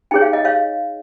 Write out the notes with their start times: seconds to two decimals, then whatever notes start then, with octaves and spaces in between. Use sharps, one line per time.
0.11 D#4 G#4 C#5 G5
0.22 F5
0.33 D#5
0.45 C#5 F5